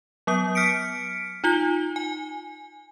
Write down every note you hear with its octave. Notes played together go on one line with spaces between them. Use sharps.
F#3 B3 D#6
F6 B6 C#7 D7
D#4 F4 G7
G#5